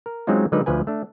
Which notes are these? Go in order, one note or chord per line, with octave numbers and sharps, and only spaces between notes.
A#4
F#3 G#3 C4 C#4 D#4 F4
D3 F#3 G#3 D#4 A#4 B4
D2 F3 B4 G#5
A3 D4